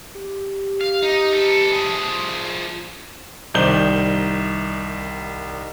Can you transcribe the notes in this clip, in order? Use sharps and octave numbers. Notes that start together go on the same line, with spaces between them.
G4
F5
D#4
A4 B4
F3 G#4
C2 D#3 C5 D5 G6 G7